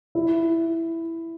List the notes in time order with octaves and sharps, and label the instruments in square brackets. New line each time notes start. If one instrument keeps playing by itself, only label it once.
[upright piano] E4